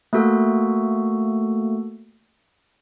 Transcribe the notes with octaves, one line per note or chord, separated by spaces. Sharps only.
A3 A#3 F#4 A4